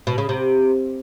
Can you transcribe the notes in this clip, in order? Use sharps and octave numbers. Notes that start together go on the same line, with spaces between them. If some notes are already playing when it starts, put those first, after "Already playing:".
B2
C#3
C3